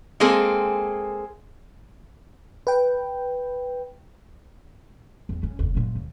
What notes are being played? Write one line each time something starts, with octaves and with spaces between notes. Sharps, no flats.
G#3 A#3 C4 G#4 A4
B4 G5
E2 C4
C#4
F1 D#2
F#2 A#2
D#2